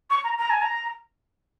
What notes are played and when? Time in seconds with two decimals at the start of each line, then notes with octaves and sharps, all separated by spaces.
0.10 C#6
0.24 A#5
0.38 A#5
0.50 G#5
0.61 A#5